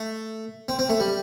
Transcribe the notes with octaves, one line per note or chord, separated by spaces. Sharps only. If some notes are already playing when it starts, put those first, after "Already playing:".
Already playing: A3
C4
C4
A3
G3